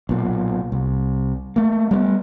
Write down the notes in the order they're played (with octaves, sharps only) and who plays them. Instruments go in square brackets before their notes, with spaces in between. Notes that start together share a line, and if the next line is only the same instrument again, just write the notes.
[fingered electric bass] B1 A#2
C2
A3 A#3
G3 A#3 B3